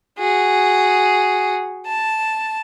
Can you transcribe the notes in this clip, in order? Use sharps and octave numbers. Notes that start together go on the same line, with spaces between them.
F#4 G#4
A5